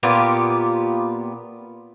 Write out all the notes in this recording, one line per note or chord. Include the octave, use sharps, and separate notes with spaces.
A#2 B3 F4 G4